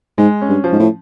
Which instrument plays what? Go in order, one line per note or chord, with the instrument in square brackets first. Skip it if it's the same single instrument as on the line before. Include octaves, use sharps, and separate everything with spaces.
[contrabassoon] G#2 [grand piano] G#3
[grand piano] C#4
[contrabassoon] G2
[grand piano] F3
[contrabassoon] G#2
A2